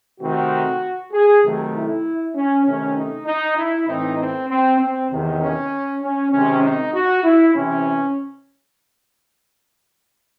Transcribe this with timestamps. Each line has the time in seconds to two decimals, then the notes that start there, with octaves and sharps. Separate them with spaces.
0.21 C3 D#3 A3 C4 F#4
1.13 G#4
1.43 C3 D#3 F#3 A3
1.74 E4
2.35 C#4
2.65 C3 D#3 A3 C#4
2.96 D#4
3.27 D#4
3.57 E4
3.88 A2 E3 C4 D#4
4.19 C4
4.50 C4
4.79 C4
5.11 E2 C3 D#3
5.41 C#4
6.02 C#4
6.32 C3 D#3 G#3 C4 C#4
6.64 D#4
6.94 F#4
7.24 E4
7.54 C3 E3 C4 C#4